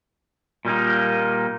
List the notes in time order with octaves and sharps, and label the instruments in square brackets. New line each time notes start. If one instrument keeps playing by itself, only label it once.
[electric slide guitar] A#2 G3 A#3 D#4